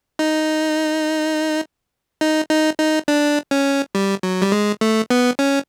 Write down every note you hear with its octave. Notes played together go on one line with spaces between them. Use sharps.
D#4
D#4
D#4
D#4
D4
C#4
G3
F#3
G3
G#3
A3
B3
C#4